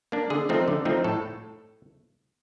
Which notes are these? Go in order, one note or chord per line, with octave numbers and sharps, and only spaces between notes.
A#3 D4
D3 G#4
F3 A3 C4 D#4
D3
F3 A3 C4 D#4
A2 A4